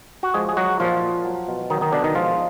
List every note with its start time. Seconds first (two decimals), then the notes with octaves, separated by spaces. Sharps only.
0.23 F#4
0.34 F3 G#3 G#4
0.49 G#4
0.57 F#3 G#3 F#4
0.80 A#2 F3 F4
1.03 A#2
1.24 F#3
1.48 B2
1.70 D#3 F#3 D#4
1.81 D#3 D#4
1.92 B2 D3 D4
2.04 D#3 D#4
2.15 F3 G#3 F4